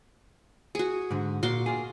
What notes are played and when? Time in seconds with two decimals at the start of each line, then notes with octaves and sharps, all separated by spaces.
0.75 F#4 G#4
1.11 G#2 D3
1.43 A#2 F#4 C6 D6
1.66 A#3 F4 G#4